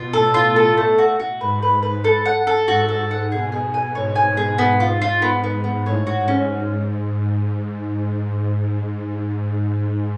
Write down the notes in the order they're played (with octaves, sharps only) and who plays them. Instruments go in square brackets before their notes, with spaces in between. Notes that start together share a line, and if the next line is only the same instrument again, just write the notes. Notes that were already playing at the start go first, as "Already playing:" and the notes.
Already playing: [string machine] B2 [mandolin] F4
[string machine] A2 [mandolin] A4
[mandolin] F4
A4
A3
F#4
F#4
[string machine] G#2 [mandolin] B4
[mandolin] B4
B4
A4
F#5
A4
[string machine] G#2 [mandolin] F#4
[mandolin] A4
F#5
[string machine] B2 [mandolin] G#4
[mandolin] G#4
G#5
[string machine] G#2 [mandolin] C#5
[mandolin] G#5
G#4
[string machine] G#2 [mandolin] B3
[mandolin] F4
F4
B3
B3
[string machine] G#2
[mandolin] B3
[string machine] A2 [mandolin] C#5
[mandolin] F#4
[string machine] G#2
[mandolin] C#4